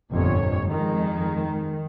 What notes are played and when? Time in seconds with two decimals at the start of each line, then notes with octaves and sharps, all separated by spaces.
0.12 G1 F2 A#2 C#5
0.70 F2 D#3 G#3